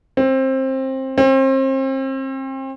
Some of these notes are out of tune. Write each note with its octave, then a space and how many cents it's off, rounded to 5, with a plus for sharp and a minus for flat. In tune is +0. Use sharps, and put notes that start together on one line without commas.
C4 +20
C4 +35